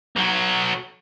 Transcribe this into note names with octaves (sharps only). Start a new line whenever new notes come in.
B1 F#3